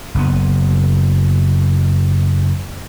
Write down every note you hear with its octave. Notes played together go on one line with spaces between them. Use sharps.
F#1 B3